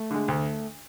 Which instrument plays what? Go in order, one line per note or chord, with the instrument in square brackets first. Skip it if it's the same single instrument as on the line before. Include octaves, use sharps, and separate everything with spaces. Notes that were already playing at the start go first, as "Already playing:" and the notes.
Already playing: [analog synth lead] A3
[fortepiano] D3 G#3
D2